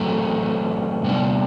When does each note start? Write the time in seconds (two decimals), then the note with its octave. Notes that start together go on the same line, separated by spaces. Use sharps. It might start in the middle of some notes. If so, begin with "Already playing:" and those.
Already playing: F#2 F#3 A3 C4
1.04 C3 G3 B3 D4